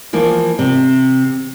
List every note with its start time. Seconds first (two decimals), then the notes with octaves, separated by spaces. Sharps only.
0.13 E3 F3 A#3 E4
0.59 C3